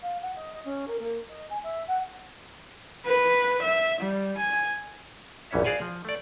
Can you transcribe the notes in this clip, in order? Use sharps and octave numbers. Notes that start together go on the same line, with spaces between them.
F5
F#5
D#5
D#5
C#4
A#4
A#3
D#5
G#5
E5
F#5
B4
E5
G3
G#5
A#1 F#2 E3 C#4 C#5 E5
F#4 G#4 D5 F5 F#5 G#5
F3
A3 D5